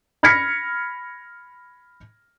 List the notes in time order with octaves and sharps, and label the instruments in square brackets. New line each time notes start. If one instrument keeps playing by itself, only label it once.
[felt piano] B5 F6 G#6 A#6 B6 C#7